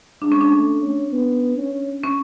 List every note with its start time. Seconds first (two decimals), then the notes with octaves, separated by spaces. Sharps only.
0.22 G#3 D4
0.32 C#4
0.41 D4
0.52 A3
0.82 C#4
1.12 B3
1.58 C#4
2.04 C#4